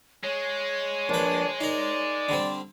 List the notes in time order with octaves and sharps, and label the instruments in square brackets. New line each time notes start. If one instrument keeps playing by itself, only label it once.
[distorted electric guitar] G#3 [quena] C#5
[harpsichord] A#1 B4 [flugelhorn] D4
[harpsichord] D#4 A#4 [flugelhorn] D5
[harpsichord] D3 G3 C4